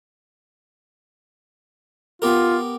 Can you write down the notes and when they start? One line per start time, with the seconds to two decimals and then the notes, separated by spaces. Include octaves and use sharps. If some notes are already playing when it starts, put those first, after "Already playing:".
2.22 B3 F4 G4 A#4